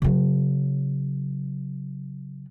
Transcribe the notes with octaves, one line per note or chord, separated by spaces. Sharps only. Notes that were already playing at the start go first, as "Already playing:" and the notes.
C#3 F#3